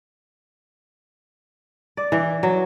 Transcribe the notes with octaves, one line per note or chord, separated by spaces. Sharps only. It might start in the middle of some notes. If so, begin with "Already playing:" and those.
D5
E3
F#3